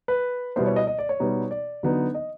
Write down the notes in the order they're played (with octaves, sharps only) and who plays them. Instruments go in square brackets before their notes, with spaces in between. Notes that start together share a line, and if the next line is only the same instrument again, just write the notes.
[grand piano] B4
B2 G3 B3 E4 C5
C#5
D#5
D#5
D5
C#5
B2 G3 B3 D#4
D5
D3 F#3 B3 D#4
D#5